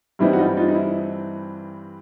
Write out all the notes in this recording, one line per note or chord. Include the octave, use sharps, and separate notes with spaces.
G2 E3 G3 C4 D#4 E4
F#4
D#4 F4
D#4 F4
D#4
E4